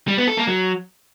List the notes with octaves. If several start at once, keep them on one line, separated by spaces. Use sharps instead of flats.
G3
B3
A4
A#3
F#3